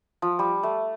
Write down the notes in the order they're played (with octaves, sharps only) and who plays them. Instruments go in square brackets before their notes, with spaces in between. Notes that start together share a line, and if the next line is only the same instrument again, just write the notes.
[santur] F3
G3
A3